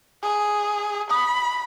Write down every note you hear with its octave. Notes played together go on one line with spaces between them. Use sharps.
G#4
B5 D#6